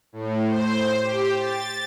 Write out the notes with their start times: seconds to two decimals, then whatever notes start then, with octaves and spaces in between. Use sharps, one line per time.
0.13 A2
0.47 C5
1.02 G4
1.40 A6